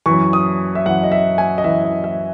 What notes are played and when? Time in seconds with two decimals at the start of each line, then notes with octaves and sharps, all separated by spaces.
0.06 F#2 E3 C#6
0.33 D#6
0.75 E5
0.86 F#2 E3 F#5
1.03 D#5
1.12 E5
1.38 G#5
1.58 D#5
1.64 F#2 E3 E5
1.84 D#5
2.04 E5